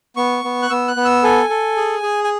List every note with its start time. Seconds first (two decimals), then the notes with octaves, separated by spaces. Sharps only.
0.16 B3 C#6
0.44 B3
0.62 F#6
0.70 B3 E6
0.88 F#6
0.96 B3
1.05 E6
1.23 A4 G#5
1.49 A4
1.77 G#4
2.03 G#4
2.24 G#5